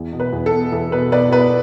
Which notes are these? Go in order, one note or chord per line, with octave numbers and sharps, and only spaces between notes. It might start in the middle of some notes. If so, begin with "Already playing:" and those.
Already playing: E2
B2
B4
E2
A4
B3
E2 A4
B2 B4
B2 B4 D5
B3 B4